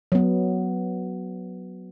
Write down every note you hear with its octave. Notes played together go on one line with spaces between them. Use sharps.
F#3 B3